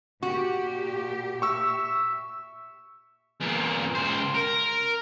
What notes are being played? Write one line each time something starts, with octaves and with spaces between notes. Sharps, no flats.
A#2 F#4 G4
E5 C#6 E6
E2 A#2
C#2 C5
A#4